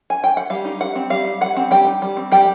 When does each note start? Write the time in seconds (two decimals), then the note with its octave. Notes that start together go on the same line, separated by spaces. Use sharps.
0.10 G#5
0.24 G5
0.37 F#5
0.50 G3 F5
0.65 D#4
0.80 G3 F#5
0.96 C4
1.10 G3 F5
1.26 D#4
1.41 G3 F#5
1.57 C4
1.71 G3 G5
1.87 D#4
2.02 G3
2.17 C4
2.32 G3 G5